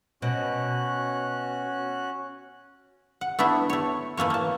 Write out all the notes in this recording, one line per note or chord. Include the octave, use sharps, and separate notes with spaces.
B2 C#4 F#4 F#6
F#5
A3 B3 D4 E4
A3 C#5
E3 A3 A#3 C#5
A#3 A5